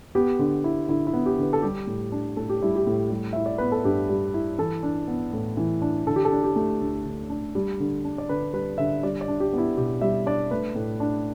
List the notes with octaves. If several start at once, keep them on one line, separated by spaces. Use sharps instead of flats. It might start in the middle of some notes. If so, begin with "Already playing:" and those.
B3 G4
D3
E4
D3 E4
E4
B3
G4
D3 B4
A4
G3 G4
A2
D4
A2 A4
G4
G3 E4
G4
A2
G3
E4 E5
D5
B3 B4
A4
G2 G4
G3
E4
E3 A4
D4
B3
A2
E3
D4
D3 A4
G4
A4
D4
G4
A3
D2
D3
D4
G3
D3
D4
D5
D3 B4
G3 B4
D3 E5
G3 D5
D5
D4
G4
B3
E4
B2 G4
G3 E5
D4 D5
A3 B4
A2
D4